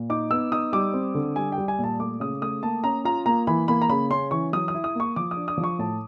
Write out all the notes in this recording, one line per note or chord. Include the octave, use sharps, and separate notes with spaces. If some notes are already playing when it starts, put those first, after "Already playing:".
Already playing: A#2
D#4 D6
B3 E6
D#4 D#6
G3 D6
C4
D3
G3 G#5
G5
G3
G#5
A#2
A5
A3 D6
C#3 D#6
A3 D#6
A#3 A5
C#4 A#5
F4 A#5
A#3 A#5
E3 B5
A#3 B5
A#5
C#3 B5
C#4 C6
E3 C#6
F#3 D#6
D#6
E4
D#6
A#3 C#6
F3 D6
D#6
D4
D#6
F3
C#6
A2 A5